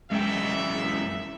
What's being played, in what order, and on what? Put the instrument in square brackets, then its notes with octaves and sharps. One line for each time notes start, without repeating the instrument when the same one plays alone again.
[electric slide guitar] F#2 E3 G5 [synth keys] G#3 [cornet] E5